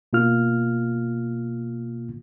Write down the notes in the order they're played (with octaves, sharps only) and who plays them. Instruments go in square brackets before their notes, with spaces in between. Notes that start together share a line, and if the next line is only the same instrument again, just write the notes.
[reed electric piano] B2 A#3 F4 F6